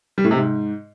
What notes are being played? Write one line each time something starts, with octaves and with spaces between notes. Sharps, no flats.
G3
A2
C3
G#2